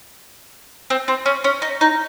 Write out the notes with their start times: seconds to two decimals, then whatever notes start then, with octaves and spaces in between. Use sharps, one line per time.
0.90 C4
1.08 C4
1.26 C#4
1.44 C#4
1.62 D#4
1.81 D#4